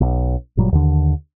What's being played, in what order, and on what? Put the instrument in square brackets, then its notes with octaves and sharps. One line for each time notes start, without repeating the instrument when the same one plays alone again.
[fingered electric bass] B1
G1 A#2 F#3 G3
D#2 D3